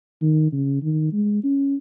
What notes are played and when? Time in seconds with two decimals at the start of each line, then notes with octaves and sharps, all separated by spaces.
0.21 D#3
0.52 C#3
0.82 D#3
1.13 G#3
1.44 C#4